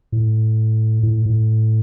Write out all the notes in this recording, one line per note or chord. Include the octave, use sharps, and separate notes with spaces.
A2
A2
A2